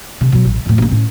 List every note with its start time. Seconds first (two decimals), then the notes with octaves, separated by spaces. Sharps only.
0.21 C3
0.32 B2 F#3
0.45 A1
0.66 F2 A2
0.78 A#1 A#3
0.92 A2 C#4